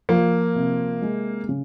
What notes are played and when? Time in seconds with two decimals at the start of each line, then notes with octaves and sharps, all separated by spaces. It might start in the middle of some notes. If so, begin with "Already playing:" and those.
0.09 F3 A#3
0.56 C3
1.02 G#3
1.49 C#3